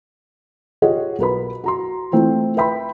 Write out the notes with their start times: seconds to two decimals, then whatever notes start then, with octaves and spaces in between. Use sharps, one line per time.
0.82 F4 G4 G#4 C#5 D#5 F#5
1.19 B1 A#4 B4 B5
1.64 F#4 A#5 C6
2.12 E3 A3 C4 E4 F4
2.57 B4 E5 G5 B5 C6